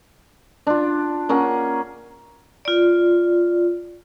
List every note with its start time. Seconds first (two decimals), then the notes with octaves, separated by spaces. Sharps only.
0.67 D4 F4
1.29 A#3 C#4 G#4 F#5
2.65 F4 D5